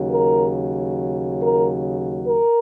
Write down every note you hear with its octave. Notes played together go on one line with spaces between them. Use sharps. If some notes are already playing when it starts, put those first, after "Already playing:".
Already playing: D#2 C#3 F#3
A#4
A#4
A#4